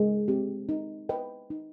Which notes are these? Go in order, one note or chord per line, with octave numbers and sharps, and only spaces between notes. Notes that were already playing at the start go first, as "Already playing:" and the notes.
Already playing: G#3
C4 G4
D#4
B4 D#5 G5
D#4